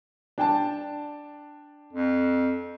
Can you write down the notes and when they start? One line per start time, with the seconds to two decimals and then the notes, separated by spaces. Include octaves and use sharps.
0.38 D4 G5 A5
1.93 F2